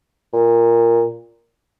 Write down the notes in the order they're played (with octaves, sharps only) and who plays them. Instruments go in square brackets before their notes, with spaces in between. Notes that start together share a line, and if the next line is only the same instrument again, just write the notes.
[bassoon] A#2